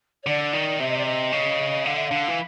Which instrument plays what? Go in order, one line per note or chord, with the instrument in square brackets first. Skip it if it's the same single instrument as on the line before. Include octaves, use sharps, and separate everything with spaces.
[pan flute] C#5
[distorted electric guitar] D3 [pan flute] D5
[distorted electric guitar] D#3
[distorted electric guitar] C3 [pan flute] E5
[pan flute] D#5
D5
D#5
[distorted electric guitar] C#3
[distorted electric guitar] D3 [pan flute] F5
[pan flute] E5
[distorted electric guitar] D3 [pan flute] F5
[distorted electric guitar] E3